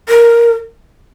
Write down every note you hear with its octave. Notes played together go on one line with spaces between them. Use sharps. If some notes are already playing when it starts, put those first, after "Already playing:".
A#4